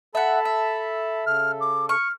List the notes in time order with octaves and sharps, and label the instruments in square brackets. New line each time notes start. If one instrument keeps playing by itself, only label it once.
[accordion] A4 A5 B5 [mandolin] E5 F#5
[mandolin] E5
[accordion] C#3 A4 [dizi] F6
[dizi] D6
[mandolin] C#6 [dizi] F6